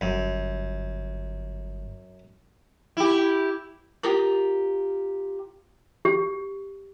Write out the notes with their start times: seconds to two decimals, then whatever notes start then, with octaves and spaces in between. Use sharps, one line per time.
0.01 G1 F#2
2.97 E4 G4
4.03 F4 G4 A#4 D#6
6.05 G4